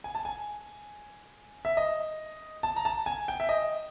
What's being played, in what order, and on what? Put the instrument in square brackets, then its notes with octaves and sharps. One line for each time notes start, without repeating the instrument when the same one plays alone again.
[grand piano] G#5
A5
G#5
E5
D#5
A5
A#5
A5
G#5
G5
E5
D#5